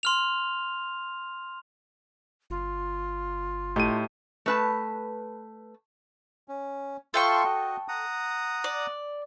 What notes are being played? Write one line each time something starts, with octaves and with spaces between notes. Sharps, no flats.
C6 F6 F7
G1 F4
A2 A3 D#4 G4 D#7
A3 B4 A5
C#4
F4 A4 E5 G5 C6 C#6
F#4 D#5
F#5 A#5 D#6
D5